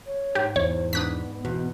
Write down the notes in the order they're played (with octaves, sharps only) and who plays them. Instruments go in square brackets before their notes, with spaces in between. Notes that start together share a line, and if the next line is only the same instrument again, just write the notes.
[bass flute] C#5
[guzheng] G#2 [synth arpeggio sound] G4
[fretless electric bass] E2 [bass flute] C5 [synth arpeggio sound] C#5
[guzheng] G#2 D4 [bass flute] B3 [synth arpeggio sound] D#6 F#6 B6
[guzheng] E2 [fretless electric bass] B2